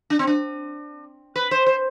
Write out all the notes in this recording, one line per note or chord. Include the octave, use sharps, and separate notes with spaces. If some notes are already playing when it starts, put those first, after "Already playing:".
D4
C4
D4
B4
C5
C5